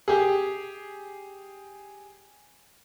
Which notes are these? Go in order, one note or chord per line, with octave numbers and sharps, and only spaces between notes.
G4 G#4